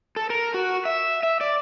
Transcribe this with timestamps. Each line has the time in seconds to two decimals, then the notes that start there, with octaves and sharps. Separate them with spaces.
0.16 A4
0.30 A#4
0.54 F#4
0.85 E5
1.23 E5
1.41 D5